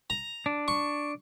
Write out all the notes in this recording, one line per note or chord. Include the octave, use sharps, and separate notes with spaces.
A#5
D4
C#6